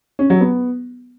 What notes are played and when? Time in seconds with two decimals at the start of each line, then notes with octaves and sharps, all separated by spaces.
0.19 C#4
0.30 F#3
0.41 B3